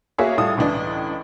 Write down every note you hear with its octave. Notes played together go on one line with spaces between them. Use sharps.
A#3 F#4 G#4 C#5 E5 F5
A2 G3 F4 A4 D#6
C#2 A2 E3 D4 D#5